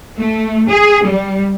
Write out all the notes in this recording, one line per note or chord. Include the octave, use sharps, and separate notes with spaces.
A3
G#4
G3